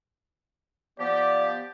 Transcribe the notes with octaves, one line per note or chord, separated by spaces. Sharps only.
F3 B3 G4 D5